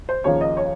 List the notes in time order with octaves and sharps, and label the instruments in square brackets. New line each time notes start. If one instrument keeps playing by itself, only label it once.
[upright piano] C5
D#2 C#3 F3 A#3 C#5
D#5
C#5